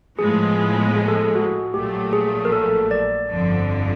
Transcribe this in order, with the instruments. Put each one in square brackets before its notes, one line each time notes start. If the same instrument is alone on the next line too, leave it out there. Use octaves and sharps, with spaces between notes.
[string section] A2 F3 G#3 B3 [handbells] G#4
[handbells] G#4
A4
G#4
F#4
[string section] A#1 A#2 F#3 A3 [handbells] G4
[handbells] G#4
A#4
A4
D5
[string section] G1 F2 D3 F3